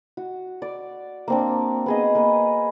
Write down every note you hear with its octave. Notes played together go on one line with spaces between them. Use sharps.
F#4
D5
A#3 C4 D4
B3 G#4 D#5
A#3 B4